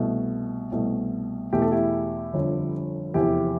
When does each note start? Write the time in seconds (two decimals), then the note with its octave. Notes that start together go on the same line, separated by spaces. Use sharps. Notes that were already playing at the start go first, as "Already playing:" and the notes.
Already playing: C2 B2 A3
0.72 C2 B2 A3
1.53 E2 B2 A3 G4
1.62 A4
1.71 E4 G4
2.34 G1 F2 D3
3.14 F1 E2 C3 E4 G4